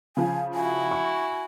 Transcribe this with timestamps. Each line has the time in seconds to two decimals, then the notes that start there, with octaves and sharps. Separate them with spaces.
0.17 C#3 F3 G#5
0.55 E4 F#4 G#5
0.91 C#6